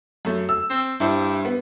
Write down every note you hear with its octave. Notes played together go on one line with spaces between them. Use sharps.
F#2 A3
E6
C4
G2 E4 C5
B3